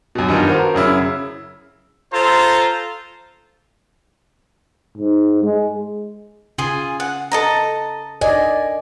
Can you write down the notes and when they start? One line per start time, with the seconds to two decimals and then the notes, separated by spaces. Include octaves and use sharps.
0.15 F#2 B2
0.28 G2 D#3 B3 F4
0.48 F#4 A#4 C5
0.75 F#2 C#3 E4
2.13 F4 A4 C5 A#5
4.98 G#2
5.43 G#3
6.58 C#3 F4 G#4 G#5
7.00 F#5
7.32 A4 D#5 A#5
8.21 D5 D#5 G#5